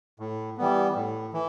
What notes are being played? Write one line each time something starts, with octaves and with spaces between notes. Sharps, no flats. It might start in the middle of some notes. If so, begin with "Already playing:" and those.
A2
E3 G3 B3
A2
E3